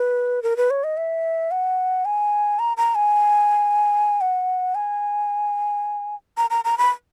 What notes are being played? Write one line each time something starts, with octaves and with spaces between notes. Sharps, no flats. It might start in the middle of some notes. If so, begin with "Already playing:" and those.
Already playing: B4
A#4
B4
C#5
D#5
E5
F#5
G#5
A#5
A#5
G#5
F#5
G#5
A#5
A#5
A#5
B5